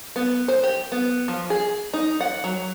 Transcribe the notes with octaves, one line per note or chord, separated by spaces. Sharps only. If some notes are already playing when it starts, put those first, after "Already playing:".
B3
C5
G4
B3
F3
G#4
D#4
F#5
F#3